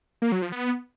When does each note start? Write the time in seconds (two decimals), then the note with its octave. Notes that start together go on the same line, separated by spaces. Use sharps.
0.22 A#3
0.32 F#3
0.42 F3
0.52 B3